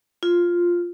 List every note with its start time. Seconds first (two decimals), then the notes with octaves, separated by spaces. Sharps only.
0.23 F4